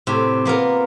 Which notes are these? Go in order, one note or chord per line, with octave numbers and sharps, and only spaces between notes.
A2 C3
A#3 B3 F4 A#4